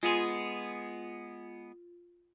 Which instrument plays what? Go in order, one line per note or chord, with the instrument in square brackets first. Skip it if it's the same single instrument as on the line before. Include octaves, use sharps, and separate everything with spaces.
[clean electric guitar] G#3 B3 G#4 [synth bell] F4